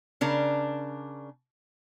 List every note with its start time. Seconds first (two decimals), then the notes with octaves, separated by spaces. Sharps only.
0.21 C#3 D4 A#4